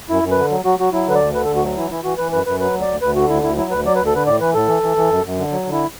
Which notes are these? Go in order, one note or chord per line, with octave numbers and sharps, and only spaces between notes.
F#2 E4
F#2
B4
D3
F#3
F#3 F#4
F#3 F#4
F#3 E4
D3 B4
D5
D2
D3 B4
A4
D2
F#4
F#3
E3 E4
E3 E4
E3 F#4
E3 B4
F#2 B4
F#2 B4
F#3 B4
D2
D5
D2
D2 B4
D3 F#4
D2 E4
D2 E4
F#3 E4
D2 B4
F#3 D5
B4
D2
A4
D3 B4
A2 D5
E3 B4
A2 A4
E3
E3
E3
F#2
F#2
D3
F#3
D3
E4